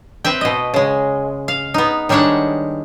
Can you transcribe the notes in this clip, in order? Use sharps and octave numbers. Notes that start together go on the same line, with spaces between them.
C4 B4 E5 G5
B2 D#5
C#3 G#3
F5
B3 D#4
D#3 G3 G#3 D4 C#5 F#5